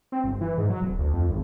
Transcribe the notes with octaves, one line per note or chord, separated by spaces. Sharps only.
C4
G1
E3
G#2
F#3
D1
D2
F2
G#1